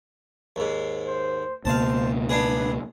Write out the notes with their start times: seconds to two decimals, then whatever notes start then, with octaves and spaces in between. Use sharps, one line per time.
0.56 D#2 G#2
1.07 C5
1.65 C#2 B2 A#3 C5 F5 A5
2.29 B3 D4 G#4 B4